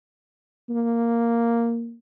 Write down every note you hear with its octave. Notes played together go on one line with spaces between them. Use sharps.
A#3